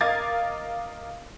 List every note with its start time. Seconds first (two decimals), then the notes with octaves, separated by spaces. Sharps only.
0.01 A#4 D#5 F5 D6 G#6 A6